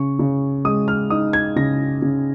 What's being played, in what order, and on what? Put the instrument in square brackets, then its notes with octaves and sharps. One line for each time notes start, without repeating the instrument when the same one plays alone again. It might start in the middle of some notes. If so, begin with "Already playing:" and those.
Already playing: [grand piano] C#3 C#6
C#3
G#3 D#6
F6
D#4 D#6
G#6
C#3 A#6
C#3